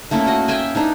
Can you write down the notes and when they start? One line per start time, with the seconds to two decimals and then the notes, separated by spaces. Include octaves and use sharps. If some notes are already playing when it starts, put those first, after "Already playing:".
0.11 A3 A#3 C#4 E4
0.26 F#4 D#5
0.48 D#5 E5 G5 G#5
0.75 E3 D4 D#4